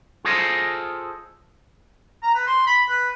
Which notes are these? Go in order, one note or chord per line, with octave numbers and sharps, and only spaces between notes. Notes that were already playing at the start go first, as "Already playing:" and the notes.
F4 G#4 A4 C5 D#5
A#5
B4
C6
B5
B4